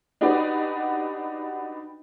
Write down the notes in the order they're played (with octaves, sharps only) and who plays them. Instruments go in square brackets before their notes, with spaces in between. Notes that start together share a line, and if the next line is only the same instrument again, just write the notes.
[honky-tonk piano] D4 D#4 F#4 G4 B4 D5